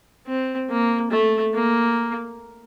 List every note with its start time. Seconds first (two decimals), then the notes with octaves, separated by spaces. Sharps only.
0.27 C4
0.69 A#3
1.11 A3
1.54 A#3